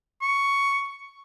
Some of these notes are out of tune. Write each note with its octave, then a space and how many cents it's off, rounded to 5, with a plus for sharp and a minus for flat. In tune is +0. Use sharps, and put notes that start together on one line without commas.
C#6 +5